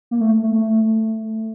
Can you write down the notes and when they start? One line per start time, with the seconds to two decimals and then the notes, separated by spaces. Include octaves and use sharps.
0.11 A#3
0.21 A3
0.43 A3
0.54 A3